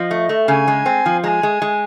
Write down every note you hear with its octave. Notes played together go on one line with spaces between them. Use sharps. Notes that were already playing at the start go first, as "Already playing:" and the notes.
Already playing: F3 D#5
A3
A3
C#3 G#5
G#3
C4
F3
G#3 G#5 A#5
G#3
G#3